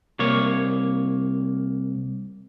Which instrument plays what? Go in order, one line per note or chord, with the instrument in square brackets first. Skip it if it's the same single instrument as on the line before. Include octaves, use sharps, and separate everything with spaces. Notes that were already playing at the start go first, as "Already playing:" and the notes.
[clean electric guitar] C2 A#3 C#5